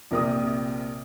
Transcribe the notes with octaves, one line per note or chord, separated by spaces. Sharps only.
A#1 C3 A#4 G5 D#6